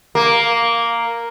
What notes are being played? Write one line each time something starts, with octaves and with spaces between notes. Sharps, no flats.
A#3